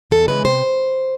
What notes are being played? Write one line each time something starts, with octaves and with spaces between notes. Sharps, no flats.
E2 A4
C#3 E3 G#3 B4
C3 C5